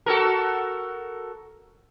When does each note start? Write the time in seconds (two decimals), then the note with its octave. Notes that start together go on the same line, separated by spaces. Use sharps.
0.06 F#4 A4 A#4